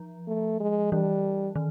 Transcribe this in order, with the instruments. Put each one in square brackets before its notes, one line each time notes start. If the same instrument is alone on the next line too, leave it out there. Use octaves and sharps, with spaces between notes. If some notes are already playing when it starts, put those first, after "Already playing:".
Already playing: [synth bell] F3
[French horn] A3
G#3
[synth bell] E3 [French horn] G3
[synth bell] D#3